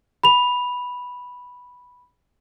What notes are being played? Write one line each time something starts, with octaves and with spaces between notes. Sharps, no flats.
B5 F7